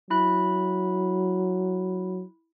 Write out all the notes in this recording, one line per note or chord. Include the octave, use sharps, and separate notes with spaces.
F#3 E4 B5 F#6